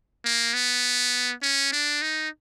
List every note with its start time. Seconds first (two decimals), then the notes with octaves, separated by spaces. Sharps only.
0.25 A#3
0.54 B3
1.42 C#4
1.72 D4
2.02 D#4